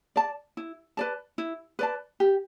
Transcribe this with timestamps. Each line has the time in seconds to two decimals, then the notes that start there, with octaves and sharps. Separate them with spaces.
0.16 D5 A5
0.57 E4
0.97 B4 D5 A5
1.38 E4
1.79 B4 D5 A5
2.20 G4